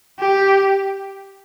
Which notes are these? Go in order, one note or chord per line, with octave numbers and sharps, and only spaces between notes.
G4